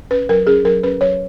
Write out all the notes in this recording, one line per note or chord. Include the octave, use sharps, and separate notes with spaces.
C#4 B4
F#3 A#4
C#4 G#4
F#3 A#4
C#4 B4
F#3 C#5